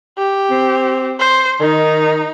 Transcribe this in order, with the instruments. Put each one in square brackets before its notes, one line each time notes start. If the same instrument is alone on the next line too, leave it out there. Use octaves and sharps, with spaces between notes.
[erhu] G4
[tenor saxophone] C4
[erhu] C5
[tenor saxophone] D#3 [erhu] D#4